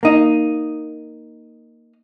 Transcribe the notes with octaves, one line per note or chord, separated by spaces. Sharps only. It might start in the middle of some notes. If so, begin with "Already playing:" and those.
A#3 D#4